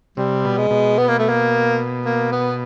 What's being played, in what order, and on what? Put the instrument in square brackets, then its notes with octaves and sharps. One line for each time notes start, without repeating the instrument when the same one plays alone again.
[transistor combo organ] C3 [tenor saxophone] G3
[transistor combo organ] B2
[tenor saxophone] G#3
[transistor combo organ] B2
[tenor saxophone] B3
A#3
A3
A#3
A#3
B3